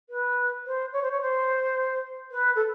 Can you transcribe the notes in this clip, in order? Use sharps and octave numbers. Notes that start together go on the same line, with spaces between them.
B4
C5
C#5
C5
C#5
C5
B4
A4